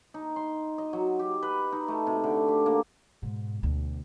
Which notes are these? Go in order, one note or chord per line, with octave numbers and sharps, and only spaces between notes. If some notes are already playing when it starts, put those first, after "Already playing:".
D#4
C6
D#5
F#3
G4
B4
D#4
A3
C3
D3
G4
A#3
G#2 B2
D2 B2